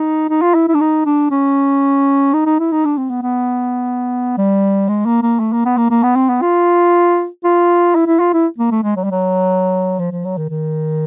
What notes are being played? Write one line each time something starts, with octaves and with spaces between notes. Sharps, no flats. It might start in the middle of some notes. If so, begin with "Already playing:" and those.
Already playing: D#4
D#4
F4
E4
E4
D4
D#4
D4
C#4
D#4
D#4
E4
D#4
D4
C4
B3
B3
G3
G#3
A#3
A#3
A3
A#3
B3
A#3
A#3
B3
C4
B3
F4
F4
E4
E4
F4
E4
A#3
A3
G#3
F#3
G3
F#3
F3
F3
F#3
D#3
D#3